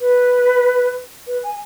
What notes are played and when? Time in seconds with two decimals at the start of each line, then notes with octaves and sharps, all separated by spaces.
0.01 B4
1.27 B4
1.43 G#5